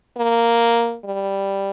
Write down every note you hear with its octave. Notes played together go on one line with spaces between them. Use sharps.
A#3
G3